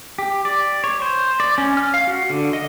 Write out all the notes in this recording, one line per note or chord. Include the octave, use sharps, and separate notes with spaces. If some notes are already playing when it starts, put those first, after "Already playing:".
G4
D5
C#5
C5
D5
C#4
F6
F5
F#4
D3
D#5